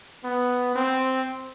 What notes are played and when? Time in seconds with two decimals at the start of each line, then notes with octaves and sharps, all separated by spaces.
0.24 B3
0.75 C4